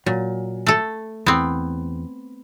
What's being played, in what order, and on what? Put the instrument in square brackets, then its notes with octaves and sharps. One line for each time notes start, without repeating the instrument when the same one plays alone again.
[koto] A#2 [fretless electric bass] F#3
[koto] A3 A4
[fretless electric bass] E2 [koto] B3 C4